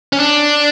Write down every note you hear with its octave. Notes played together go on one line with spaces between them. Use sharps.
C#4
D4